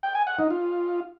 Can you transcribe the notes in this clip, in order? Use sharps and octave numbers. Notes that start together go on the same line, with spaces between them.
G5
G#5
F#5
D#4
F4